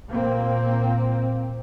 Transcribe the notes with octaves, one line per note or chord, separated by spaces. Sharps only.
A#2 A#3 C4